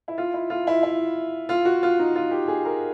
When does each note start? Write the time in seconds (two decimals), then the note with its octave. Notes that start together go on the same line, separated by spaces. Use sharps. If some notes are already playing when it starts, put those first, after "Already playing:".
0.08 E4
0.18 F4
0.34 E4
0.50 F4
0.67 E4
0.83 E4
1.49 F4
1.65 F#4
1.83 F4
1.99 D#4
2.16 F4
2.31 G4
2.48 G#4
2.65 A#4